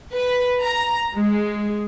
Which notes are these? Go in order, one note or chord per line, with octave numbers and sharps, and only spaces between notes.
B4
A#5
G#3